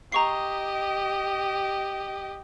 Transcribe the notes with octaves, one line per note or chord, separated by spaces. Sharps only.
G4 D#5 A#5 C#6 C7